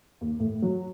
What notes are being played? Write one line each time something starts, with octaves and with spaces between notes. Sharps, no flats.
D#2
A2
F#3